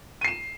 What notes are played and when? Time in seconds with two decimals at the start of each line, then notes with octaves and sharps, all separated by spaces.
0.21 D#7
0.25 C7
0.28 E7